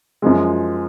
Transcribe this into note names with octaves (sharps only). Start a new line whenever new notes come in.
F#2 F3 G#3